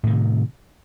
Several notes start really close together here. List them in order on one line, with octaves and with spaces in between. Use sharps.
A2 D#3 C3